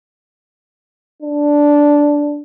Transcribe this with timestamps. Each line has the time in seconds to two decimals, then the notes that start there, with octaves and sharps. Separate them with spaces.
1.22 D4